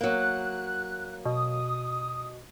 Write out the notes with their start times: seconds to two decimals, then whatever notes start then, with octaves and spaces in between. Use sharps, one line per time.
0.01 F#3 A#3 F#6
1.25 B2 D#6